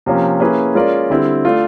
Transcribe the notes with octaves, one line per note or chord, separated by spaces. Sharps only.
C3 F3 A#3 C#4
A#3 C#4 E4 G#4 B4
G#3 C#4 F4 A#4 D5
D3 G3 C4 E4
A3 D4 F4